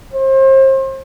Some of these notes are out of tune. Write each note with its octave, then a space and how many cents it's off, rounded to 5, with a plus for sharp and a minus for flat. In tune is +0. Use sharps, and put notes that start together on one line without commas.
C5 +35